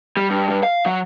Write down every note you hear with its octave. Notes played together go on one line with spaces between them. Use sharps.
G3
G2
G2
F5
F#3